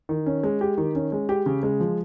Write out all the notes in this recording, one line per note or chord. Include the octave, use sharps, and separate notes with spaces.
D#3
C#4
G#3
G4
D#3
C#4
G#3
G4
C#3
G#3
F3